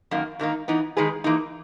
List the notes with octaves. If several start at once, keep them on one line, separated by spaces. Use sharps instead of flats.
F#2 D#3 A#3
G#2 D#3 A#3 D#4
E3 B3 D#4
D#3 G#3 D#4 G#4 B4
E3 A#3 D#4